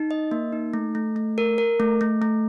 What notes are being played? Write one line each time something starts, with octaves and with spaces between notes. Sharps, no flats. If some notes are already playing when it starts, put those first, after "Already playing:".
Already playing: D#4
D#5
A#3
D#4
A3
A3
A3
A#4
A#4
A3
A3
A3